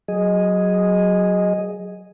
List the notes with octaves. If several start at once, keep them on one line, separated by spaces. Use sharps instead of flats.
F#3 G#4 D#5